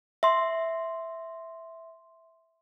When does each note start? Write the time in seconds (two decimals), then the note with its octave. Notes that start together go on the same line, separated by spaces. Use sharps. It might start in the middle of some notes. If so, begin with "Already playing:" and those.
0.23 E5 C6